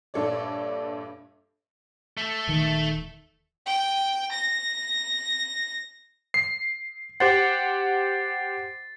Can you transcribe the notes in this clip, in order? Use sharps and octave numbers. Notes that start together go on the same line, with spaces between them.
A#1 G2 A4 C#5 D5
A3 A4
D#1 D#3
G5
A#6
C7
G4 C5 F#5 A6 C7